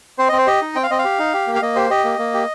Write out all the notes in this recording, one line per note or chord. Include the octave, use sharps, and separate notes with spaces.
C4 C5
C4 D#5
C5
G4 D#5
D#4
C4 G5
F5
C4 D#5
F5
G4
D#4
G4
A#3
F5
A#3 D#5
G4 C5
G4 D#5
A#3
A#3
G4